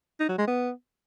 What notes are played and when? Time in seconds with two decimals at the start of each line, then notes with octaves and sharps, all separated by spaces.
0.20 D#4
0.29 F#3
0.38 G#3
0.47 B3